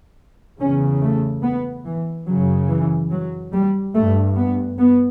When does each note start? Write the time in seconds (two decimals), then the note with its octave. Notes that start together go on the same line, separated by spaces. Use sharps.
0.59 E2 C#3 C#4
1.01 A3
1.43 B3
1.85 E3
2.27 F#2 C#3 F#3
2.69 E3
3.11 F#3
3.53 G3
3.95 G2 A3
4.37 B3
4.79 B3